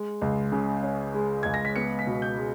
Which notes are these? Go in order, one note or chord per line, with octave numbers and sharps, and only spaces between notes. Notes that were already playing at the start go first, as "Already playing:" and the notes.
Already playing: G#3
C#2
C#3
C#4
G#3
C#2 G#6
A#6
B6
B3 C#7
B6
B2
G6
G#3